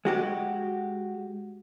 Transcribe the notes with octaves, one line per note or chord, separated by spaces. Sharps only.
G#3 F#4 G4